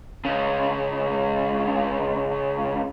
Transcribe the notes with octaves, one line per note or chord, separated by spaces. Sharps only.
C#2 C#3